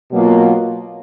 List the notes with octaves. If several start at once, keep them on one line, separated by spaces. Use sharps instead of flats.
B2 F#3 A#3 F4